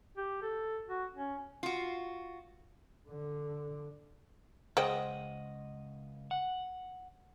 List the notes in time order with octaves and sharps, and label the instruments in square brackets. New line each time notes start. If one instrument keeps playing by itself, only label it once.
[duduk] G4
A4
F#4
C#4
[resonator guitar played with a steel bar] F4 F#4
[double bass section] D3
[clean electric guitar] C#2 D#5 F#5 [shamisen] G#4 C5 G5
[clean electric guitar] F#5